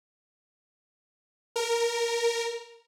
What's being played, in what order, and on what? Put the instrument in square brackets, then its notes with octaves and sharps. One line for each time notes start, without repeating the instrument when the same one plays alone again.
[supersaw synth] A#4